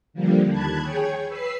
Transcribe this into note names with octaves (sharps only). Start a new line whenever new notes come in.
D3 F3 G3 A#3
D#2 A5 B5 F#6 G#6
G#4 C#5 G5 C#6
B4 E6 B6 C7